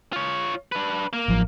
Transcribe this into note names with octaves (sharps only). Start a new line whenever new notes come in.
F4 C#5
D4 B4
A#3
A1 F3 F#3